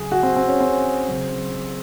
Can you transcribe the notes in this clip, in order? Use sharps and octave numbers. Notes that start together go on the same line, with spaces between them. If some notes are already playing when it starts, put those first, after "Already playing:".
Already playing: C#3 F#3 G#4
F#4
C4
C4
C#4
C4
C#3 F#3